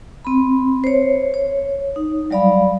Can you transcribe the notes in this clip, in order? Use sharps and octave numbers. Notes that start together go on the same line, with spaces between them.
C4 B5
C5 C#5
C#5
D#4
F#3 G3 D5 F5 B5